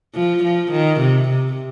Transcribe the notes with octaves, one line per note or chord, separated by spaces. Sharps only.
F3
F3
D#3
C3
C3